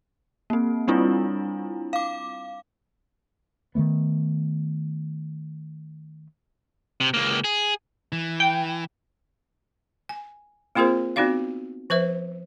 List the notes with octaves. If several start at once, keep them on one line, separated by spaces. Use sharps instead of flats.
A#3 C4
G3 C4 D4 E4 F4
F5 D6
D#3 F3 A3 B3
C3
C#2 A#3
G#4
E3
G5
G#5
A#3 C4 F4 G#4 A#4 C5
B3 C4 D#4 F#4 D5 F5
F3 B4 C5 E5